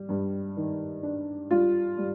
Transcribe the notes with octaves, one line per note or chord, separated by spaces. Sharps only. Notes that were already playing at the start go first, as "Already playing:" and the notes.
Already playing: G3
G2
D#3
D4
G3 F4
G3